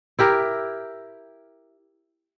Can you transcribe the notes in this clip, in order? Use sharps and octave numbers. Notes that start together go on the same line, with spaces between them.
E4 G4 A#4 E5